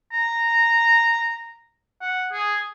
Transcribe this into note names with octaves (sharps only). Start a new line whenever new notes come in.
A#5
F#5
G#4